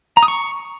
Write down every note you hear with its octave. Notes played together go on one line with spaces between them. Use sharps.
A#5
D#6
C#6